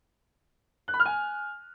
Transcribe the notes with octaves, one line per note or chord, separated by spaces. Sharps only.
F#6
B5
F6
G#5